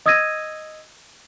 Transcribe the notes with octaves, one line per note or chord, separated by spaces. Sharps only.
D#5 D#6 E6 G#6 A#6 D#7